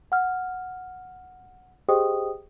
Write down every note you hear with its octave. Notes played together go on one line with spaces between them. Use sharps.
F#5 F6
G4 G#4 C5 D#5 G5 D#6